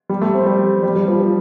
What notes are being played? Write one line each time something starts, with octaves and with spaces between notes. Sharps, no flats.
G3
A3
C4
G3
G3
G3
F3
F3